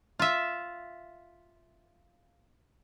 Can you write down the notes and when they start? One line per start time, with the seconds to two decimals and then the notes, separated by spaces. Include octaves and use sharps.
0.19 F4 E5